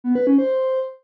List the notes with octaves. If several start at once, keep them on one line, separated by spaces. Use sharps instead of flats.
B3
B4
C#4
C5